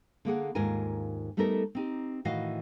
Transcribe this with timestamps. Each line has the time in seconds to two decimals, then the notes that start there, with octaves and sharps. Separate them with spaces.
0.25 D3 A#3 G#4 F#5
0.55 D#2 G#2 F4 A#4 G#5
1.37 G3 A3 B3 D#4 A4 A#4
1.75 C4 D#4 G4
2.25 A2 D#3 E3 F#4 D#5 F5